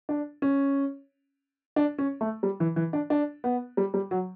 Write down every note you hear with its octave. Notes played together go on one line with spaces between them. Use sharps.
D4
C#4
D4
C#4
A3
G3
E3
E3
D4
D4
B3
G3
G3
F#3